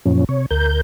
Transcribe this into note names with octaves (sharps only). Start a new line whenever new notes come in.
F#2 A#2 F3 C#4
C3 C#5
D2 A#4 G6